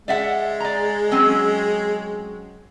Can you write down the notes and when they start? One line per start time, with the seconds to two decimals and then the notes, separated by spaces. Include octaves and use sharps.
0.08 G#3 D5 E5 F#5
0.60 D5 A#5
1.11 F#3 C4 C#4